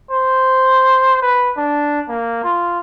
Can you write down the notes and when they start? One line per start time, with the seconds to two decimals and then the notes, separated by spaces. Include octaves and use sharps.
0.11 C5
1.23 B4
1.57 D4
2.09 A#3
2.44 F4